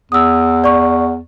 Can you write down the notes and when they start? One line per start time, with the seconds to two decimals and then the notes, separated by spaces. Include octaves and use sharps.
0.12 E2 D#6 E6
0.64 D5 C#6